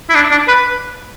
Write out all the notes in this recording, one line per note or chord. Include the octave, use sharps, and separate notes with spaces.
E4
D4
D4
B4